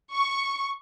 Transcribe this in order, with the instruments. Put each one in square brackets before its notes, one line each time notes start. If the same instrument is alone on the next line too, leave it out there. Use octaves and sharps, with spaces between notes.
[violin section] C#6